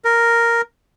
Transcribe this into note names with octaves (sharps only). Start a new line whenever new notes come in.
A#4